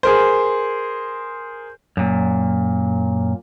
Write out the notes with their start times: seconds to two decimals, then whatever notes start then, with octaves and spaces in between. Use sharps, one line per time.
0.03 G#4 A#4 C5
1.97 F#2 A#2